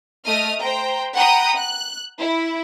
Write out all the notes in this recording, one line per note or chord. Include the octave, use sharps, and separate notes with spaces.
A3 D#5 D#6 F6
C5 G5 A#5
F#5 G5 A#5 B5 D#6 F#6
F#6
E4